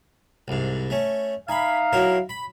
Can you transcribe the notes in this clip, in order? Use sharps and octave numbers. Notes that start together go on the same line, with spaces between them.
C2 G#2
A3 C#4
D#4 E5 F5 G#5 B5
F#3 E4 A#4
B5